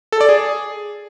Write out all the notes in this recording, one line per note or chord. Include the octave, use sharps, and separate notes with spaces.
A4
D5
G#4